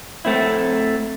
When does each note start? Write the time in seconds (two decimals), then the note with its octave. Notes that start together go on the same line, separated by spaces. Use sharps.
0.25 A3 C4 E4